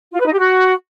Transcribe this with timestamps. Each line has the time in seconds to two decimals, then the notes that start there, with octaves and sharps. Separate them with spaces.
0.13 F4
0.20 B4
0.26 D#4
0.33 G4
0.40 F#4